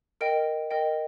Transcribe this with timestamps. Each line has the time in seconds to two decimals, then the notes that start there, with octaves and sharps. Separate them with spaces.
0.21 A#4 D#5 G5 D7
0.71 A#4 D#5 G5